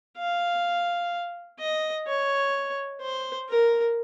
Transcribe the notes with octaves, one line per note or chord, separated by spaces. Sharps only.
F5
D#5
C#5
C5
A#4